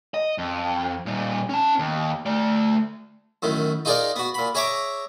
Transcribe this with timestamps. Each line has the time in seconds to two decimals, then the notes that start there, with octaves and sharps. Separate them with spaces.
0.14 D#5
0.38 F2
1.06 A#2 G3
1.49 C#4 A5
1.79 D#2
2.26 A3 D5
3.42 F#2 A2 D#3
3.85 D#4 F4 G#4 A#4 D5 F5
4.16 B3 F#4
4.34 A#2 B5
4.55 G#4 C#5 E5 A#5 C#6 D6